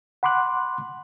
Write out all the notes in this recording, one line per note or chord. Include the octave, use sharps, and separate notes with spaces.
F#5 B5 C6 D6 F#6